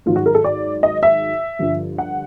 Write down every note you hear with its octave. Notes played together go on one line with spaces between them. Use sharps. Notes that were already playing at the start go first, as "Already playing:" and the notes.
G#2 D#3 F#3 F4
F#4
A#4
A4
D5
D#5
E5
G2 D3 F3
F#5